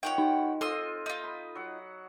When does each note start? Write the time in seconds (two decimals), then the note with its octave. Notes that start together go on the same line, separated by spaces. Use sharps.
0.03 D#3 F3 C#5 F#5 G5
0.18 D#4
0.61 C4 F4 A4 C6 D#6 E6 D#7
1.06 D#4 F4 D#5
1.24 B5
1.55 F#3 F#5